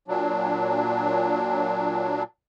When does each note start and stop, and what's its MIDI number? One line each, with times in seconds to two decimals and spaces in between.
0.08 2.23 46
0.08 2.23 54
0.08 2.23 62